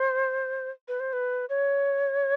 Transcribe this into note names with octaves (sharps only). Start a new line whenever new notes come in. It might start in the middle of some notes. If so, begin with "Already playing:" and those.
Already playing: C5
B4
C5
B4
C#5